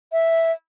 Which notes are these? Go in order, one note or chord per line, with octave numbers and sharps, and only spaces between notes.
E5